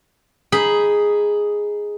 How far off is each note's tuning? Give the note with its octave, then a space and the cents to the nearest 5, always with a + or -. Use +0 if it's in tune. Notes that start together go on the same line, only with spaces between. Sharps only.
D#4 +0 G#4 +0 B5 +0